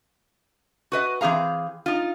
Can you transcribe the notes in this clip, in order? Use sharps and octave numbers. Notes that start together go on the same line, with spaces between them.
F#4 B4 D#5
E3 C4 G#4 F5 A#5
D#4 F4